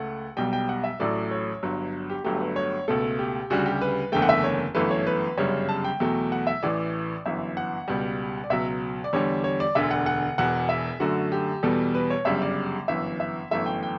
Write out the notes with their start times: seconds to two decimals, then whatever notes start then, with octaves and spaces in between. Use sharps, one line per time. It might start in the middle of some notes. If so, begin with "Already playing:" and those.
Already playing: C#2 A3 F#5
0.37 B1 B2 G3 G5
0.53 G5
0.69 F#5
0.84 E5
1.00 A1 A2 F#3 A3 D5
1.31 C#5
1.63 G1 G2 F#3
2.10 G4
2.24 G1 G2 F#3 A3 G4
2.41 B4
2.56 C#5
2.88 C#2 B2 A3 A4
3.19 G4
3.50 D2 C#3 G3 F#4
3.66 G4
3.81 B4
4.12 F#1 E2 D3 A3 G5
4.22 F#5
4.29 E5
4.44 C#5
4.75 G1 F#2 E3 A3 B4
4.91 C#5
5.07 B4
5.37 G1 F#2 C#3 G3 C#5
5.69 A5
5.84 G5
6.00 E2 B2 F#3 A3
6.32 F#5
6.47 E5
6.63 A1 A2 E3 D5
7.26 G1 F#2 E3 E5
7.57 F#5
7.88 C#2 B2 G3
8.44 D5
8.50 C#2 B2 F#3 E5
9.04 D5
9.13 E2 D3 G3 C#5
9.44 C#5
9.60 D5
9.75 E1 D2 D3 E5
9.91 F#5
10.06 F#5
10.38 E1 E2 B2 F#5
10.69 E5
11.00 F#2 D3 A3 F#4
11.32 G4
11.63 E2 B2 G3 A4
11.95 B4
12.10 C#5
12.25 G1 F#2 C#3 G3 E5
12.42 D5
12.88 G1 F#2 E3 E5
13.20 E5
13.51 G1 F#2 E3 A3 E5
13.66 G5
13.83 G5